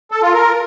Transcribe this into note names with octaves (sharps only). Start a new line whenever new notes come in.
A4
F4
A#4